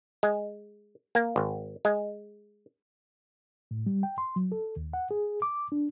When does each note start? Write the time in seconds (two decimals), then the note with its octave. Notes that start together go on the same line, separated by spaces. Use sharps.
0.23 G#3
1.15 A#3
1.36 G#1
1.85 G#3
3.71 A2
3.86 G3
4.03 G5
4.18 C6
4.36 F#3
4.52 A4
4.77 D#2
4.93 F#5
5.11 G#4
5.42 D6
5.72 D4